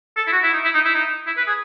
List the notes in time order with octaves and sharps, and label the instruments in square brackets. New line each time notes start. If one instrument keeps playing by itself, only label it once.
[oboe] A4
E4
F#4
E4
D#4
E4
D#4
E4
D#4
E4
B4
G#4